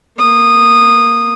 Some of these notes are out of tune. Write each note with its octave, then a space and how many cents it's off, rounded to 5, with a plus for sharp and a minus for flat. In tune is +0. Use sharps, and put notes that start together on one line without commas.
A#3 +0 D#6 -15